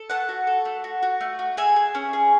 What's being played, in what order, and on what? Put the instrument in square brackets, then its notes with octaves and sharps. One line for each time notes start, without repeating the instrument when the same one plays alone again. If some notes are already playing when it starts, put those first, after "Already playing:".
Already playing: [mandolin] A4
A3 F#5 A5
F#4
A4
A3
F#4
F#4
A3
F#4
G#4 E5 G#5
G#4
C#4
G#4